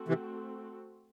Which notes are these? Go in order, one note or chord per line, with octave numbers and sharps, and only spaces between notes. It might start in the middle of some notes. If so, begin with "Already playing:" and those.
Already playing: A3 C4 F#4 A4
C3 E3